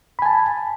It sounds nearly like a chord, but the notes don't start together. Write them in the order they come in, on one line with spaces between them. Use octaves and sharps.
B5 G#5 A5